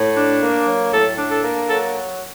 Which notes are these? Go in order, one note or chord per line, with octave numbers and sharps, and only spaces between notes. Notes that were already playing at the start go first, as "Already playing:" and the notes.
Already playing: A2
D4
A#3
F#3
A2 A4
D4
A4
A#3
F#3 A4